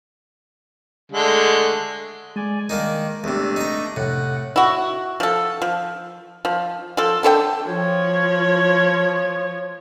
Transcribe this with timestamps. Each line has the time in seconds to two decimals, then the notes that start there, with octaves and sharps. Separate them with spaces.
1.12 D3 G#3 A3
2.36 G#3 D5 G#5
2.69 D#3 A#3 D4 D#4
3.24 E2 C3 A3 D4
3.56 D#4 A#5
3.96 F2 A2 C3 F#5
4.56 E4 F#4
5.20 F3 A4
5.62 F3
6.45 F3
6.97 F3 A4
7.23 D3 A4 C5 G5
7.67 F3 C#5